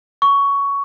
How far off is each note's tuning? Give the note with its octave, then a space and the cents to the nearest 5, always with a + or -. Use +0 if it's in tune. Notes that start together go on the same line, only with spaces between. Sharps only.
C#6 +15